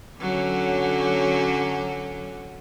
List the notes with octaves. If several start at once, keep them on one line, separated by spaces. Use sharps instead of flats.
D3 F#3 C#4